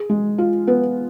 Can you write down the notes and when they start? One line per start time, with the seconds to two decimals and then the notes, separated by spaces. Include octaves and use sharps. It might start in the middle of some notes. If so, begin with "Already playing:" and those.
Already playing: G#4
0.09 G#3
0.38 F4
0.67 B3